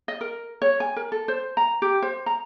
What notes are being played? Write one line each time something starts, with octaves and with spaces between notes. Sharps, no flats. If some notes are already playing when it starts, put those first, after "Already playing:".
D#5
A#4
C#5
G#5
A#4
A4
C5
A#5
G4
C5
A#5